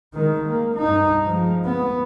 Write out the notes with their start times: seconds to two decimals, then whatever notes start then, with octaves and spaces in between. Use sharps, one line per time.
0.14 D#3 G#3
0.46 A#3
0.76 G2 D#4
1.26 F3 G#3
1.64 B3